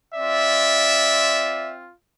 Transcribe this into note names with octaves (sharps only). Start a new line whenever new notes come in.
C4 F4 D5 E5